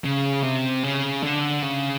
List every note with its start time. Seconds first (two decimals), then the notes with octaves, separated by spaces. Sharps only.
0.05 C#3
0.43 C3
0.83 C#3
1.23 D3
1.62 C#3